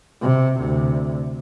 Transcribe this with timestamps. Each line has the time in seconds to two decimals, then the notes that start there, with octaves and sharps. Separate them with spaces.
0.22 C3
0.59 D2 C3